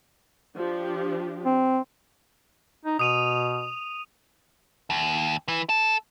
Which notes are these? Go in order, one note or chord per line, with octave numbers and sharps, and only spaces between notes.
F3 D4 G4
C4
D#4
B2 D#6 D#7 F7
D#2
E3
A4